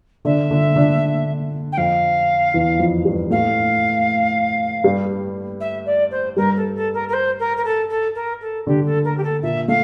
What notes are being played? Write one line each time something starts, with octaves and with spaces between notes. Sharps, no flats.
D3 D4 E5
D3 D4
D3 D4
G5
F2 F3 F5
E2 E3
F2 F3
G2 G3
A2 A3 F5
G2 G3
E5
D5
C5
G2 G3 A#4
A4
A4
A#4
A#4
C5
A#4
A#4
A4
A4
A#4
A4
D3 D4 G4
A4
A#4
G4
A4
A#2 A#3 E5
A3 F5